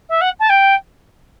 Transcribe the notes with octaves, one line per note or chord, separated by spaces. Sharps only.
E5
F#5
A5
G5